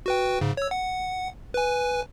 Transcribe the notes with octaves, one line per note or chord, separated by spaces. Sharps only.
F#4 B4 G5
G#2 C#3
C#5 E6
F#5
B4 G#5